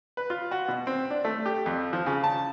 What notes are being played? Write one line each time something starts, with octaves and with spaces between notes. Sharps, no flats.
B4
F4
F#4
B2
C4
D4
A3
G4
F2
F3
C#3
A5